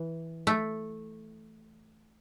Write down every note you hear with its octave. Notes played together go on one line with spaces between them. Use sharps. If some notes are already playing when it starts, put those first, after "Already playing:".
Already playing: E3
A3